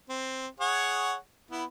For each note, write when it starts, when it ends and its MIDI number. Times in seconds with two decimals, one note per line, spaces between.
0.09 0.47 60
0.60 1.15 68
0.60 1.15 73
0.60 1.15 78
1.51 1.64 59
1.51 1.64 64